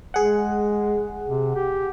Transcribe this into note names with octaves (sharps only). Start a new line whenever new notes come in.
G#3 G#4 F#5
C3
G4